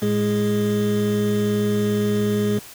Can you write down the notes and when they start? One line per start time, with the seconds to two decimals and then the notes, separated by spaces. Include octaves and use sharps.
0.02 A2 G#3 G#4